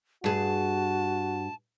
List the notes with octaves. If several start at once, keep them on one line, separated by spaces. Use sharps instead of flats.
G2 F#4 G#4 A5